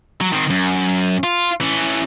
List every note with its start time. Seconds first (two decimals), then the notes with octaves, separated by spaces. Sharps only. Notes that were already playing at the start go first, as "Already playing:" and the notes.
0.21 F#3
0.33 D#3 C4
0.50 F#2
1.23 F4
1.61 E3 C#4